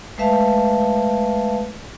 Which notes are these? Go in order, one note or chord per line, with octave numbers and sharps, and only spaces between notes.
G#3 A3 B4 E5 F5 A5